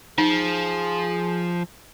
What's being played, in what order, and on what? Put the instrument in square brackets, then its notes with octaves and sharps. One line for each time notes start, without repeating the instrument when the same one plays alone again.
[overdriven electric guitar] F3 [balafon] D#4 [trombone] G#4